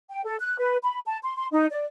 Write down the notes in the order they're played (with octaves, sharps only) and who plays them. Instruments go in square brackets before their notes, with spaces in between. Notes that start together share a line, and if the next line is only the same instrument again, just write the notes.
[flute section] G5
A4
F#6
B4
B5
A5
C6
C6
D#4
D5